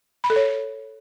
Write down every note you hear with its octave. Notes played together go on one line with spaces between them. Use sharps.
B5
A4
C#5